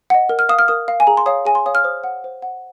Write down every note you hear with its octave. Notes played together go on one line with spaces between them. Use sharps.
D#5 F#5
A#4
F6
F5 D#6
F6
A#4 D#6
F5
G#5
G#4 A#5
C6
C#5 F5 D#6
G#4 G#5
C6
C#5 F5 D#6
F6
C5 D#6
F#5
C5
F#5